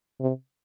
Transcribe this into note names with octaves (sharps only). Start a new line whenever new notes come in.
C3